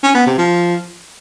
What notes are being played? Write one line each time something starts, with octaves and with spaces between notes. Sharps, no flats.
C#4
B3
C3
F3